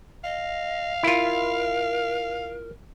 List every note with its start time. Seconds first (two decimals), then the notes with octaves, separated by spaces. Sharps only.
0.24 D#5 F5
1.03 E4 F4 A#4